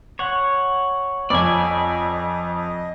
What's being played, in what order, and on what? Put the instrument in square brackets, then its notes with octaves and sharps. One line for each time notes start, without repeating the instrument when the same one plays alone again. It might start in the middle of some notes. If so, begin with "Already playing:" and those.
[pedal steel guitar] C#5 F#5
[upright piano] F2 [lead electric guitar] D5 G#5 [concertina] D#5